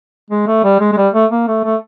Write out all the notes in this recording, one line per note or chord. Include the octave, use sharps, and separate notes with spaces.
G#3
A3
G3
G#3
G#3
G3
A3
A#3
A3
A3